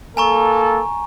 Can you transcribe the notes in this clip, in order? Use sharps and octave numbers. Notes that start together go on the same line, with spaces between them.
A#3 A4 G#5 A#5 C#6